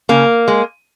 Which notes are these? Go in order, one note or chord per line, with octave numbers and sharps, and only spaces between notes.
C#3 A#3
G#3